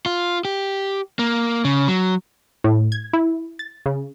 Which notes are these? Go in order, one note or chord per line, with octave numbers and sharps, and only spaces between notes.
F4
G4
A#3
C#3
F#3
A2
G#6
E4
A6
C#3